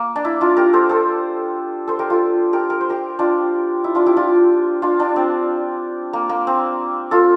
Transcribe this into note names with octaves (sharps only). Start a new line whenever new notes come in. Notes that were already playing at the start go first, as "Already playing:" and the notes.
Already playing: A#3
D4
E4
D4 F4
G4 A#4
A4 C5
A4 C5
A4 C5
G4 A#4
F4 A4
G4 A#4
A#4
C5
G4 A#4
D4 F4
E4
D4 F4
E4 G4
D4 F4
D4 F4
D4
C4
A#3
A#3
C4
F4 A4